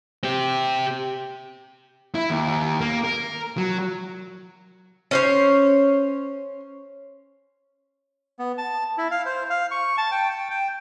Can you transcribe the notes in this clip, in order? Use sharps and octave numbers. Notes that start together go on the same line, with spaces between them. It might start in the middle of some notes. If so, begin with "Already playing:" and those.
C4 G4
E4
D#2
A#3
A#4
F#3
C#4 C5 C#5
B3
A5
E4
F5
C5
F5
C#6
A5
G5
G5
G5